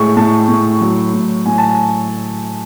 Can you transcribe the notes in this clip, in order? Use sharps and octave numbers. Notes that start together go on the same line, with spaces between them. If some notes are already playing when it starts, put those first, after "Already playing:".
Already playing: A2 G#3 C#6
A2 A5
A2
F#3
A2
A2 G#5
A5
G#5